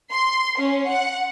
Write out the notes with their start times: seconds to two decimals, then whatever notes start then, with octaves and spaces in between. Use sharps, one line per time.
0.12 C6
0.59 C#4
0.88 F#5